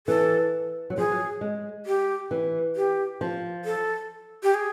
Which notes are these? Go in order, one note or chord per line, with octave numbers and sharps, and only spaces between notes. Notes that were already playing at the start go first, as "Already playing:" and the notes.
E3 A4
F#3
F3 G#4
F#3
G#3
G4
E3
G4
F3
A4
G4
G#4